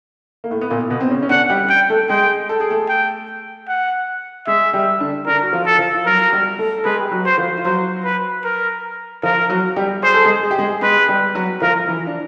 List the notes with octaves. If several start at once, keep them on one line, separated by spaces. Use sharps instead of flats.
A#3
A2 A3
B3
A#2 A#3
B2 B3
C4
C#3 C#4
C#4
D3 D4 F#5
G3 G4
G5
A3 A4
G#3 G#4 G5
A4
G#4
A3 A4
G5
F#5
G#3 G#4 E5
G3 G4
D3 D4
D3 D4 A#4
F#4
F3 F4
A4
F3 F4
F4
F#3 F#4 A#4
F#4
G3 G4
A3 A4
A4
G#3 G#4 B4
G4
F#3 F#4
F#4 C5
F3 F4
F4
F#3 F#4 C5
B4
A#4
F3 F4 A#4
F#3 F#4
G3 G4
G#4 C5
A4
G#3 G#4
G#4
G4
G#3 G#4
G#3 G#4 B4
G3 G4
F#3 F#4
F3 F4 A#4
E3 E4
D4